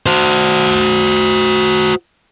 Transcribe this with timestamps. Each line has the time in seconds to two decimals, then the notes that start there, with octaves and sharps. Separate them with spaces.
0.06 F#4 C5